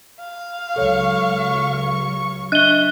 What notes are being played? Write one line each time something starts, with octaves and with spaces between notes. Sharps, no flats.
F5
C#2 F#3 A4 C#5 C#6
D4 D#5 E5 F#6 D#7 G7